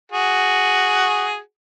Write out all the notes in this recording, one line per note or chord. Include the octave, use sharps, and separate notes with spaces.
F#4 G#4